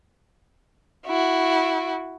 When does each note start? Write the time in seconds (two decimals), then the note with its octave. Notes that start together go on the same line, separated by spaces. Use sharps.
1.07 E4 F#4